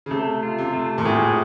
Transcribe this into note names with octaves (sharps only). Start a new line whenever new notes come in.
C#3
C3 A3
F4
C3
A3
A#2
A2 G#4